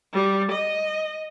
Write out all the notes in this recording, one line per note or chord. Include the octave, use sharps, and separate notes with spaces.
G3
D#5